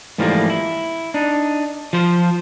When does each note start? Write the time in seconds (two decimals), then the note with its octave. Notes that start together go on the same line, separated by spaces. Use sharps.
0.18 G#2 E3 F3 G3 A3 A#3
0.50 E4
1.14 D4 D#4
1.93 F3 C5